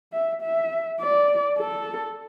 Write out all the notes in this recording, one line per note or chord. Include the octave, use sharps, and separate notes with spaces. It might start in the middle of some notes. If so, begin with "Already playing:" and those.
E5
E5
D5
A4